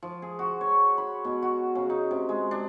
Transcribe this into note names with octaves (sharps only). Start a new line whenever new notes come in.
F3
G#4
F#4
C#5
B5
B2
F#4
C#3
D#4
C3
G#3
D4